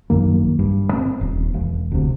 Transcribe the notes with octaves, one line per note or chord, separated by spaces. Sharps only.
A#1 F#2 D#3 A#3
G2
B3 C4
D#1
E1
D2 C3